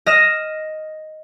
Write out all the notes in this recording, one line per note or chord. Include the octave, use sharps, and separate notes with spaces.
D#5 F6 A#6 E7